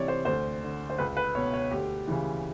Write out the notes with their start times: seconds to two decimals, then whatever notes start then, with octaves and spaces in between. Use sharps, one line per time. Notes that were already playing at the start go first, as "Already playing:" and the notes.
Already playing: C2 C3 E3 C#5 D5
0.08 C5
0.25 D2 C5
0.63 D3
0.90 C5
0.98 C#2 B4
1.17 B4
1.35 B2 C#5
1.53 C#5
1.71 D2 G4
2.07 C#3 E3